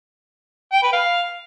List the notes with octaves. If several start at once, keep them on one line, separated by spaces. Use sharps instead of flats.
G5
B4
F5